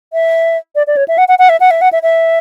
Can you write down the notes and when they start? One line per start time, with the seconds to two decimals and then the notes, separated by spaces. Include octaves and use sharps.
0.13 E5
0.75 D5
0.87 D5
0.96 C#5
1.08 E5
1.18 F#5
1.28 F#5
1.39 F#5
1.49 E5
1.60 F#5
1.71 E5
1.81 F#5
1.92 E5
2.03 E5